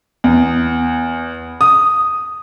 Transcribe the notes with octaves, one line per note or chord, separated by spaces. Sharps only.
E2
D#6